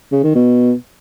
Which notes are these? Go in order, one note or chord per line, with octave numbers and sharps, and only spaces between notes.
C#3
D#3
B2